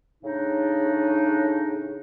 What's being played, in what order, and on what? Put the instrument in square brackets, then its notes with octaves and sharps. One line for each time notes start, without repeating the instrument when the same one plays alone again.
[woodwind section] A2 C#3 D4 D#4